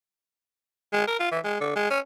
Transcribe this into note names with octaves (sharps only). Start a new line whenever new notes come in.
G#3
A#4
F4
E3
G#3
D3
G#3
C#4